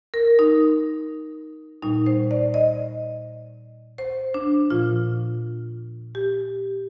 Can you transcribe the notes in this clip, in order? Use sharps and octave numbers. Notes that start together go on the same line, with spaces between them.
A#4
D#4
A#2 G3 D#4
C5
D5
D#5
C5
D4
A#2 F3 F4
G4